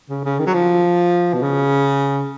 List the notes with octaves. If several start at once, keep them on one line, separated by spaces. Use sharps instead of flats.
C#3
C#3
D#3
F#3
F3
B2
C#3